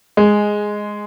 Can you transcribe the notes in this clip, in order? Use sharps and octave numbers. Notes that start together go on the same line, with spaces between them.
G#3